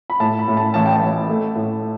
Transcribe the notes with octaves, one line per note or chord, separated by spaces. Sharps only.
B5
A2 A5
B5
A2
A5
A1 A5
G5
A5
A1
A3
A2